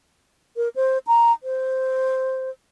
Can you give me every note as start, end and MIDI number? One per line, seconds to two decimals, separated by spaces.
0.57 0.69 70
0.76 0.98 72
1.07 1.32 82
1.43 2.50 72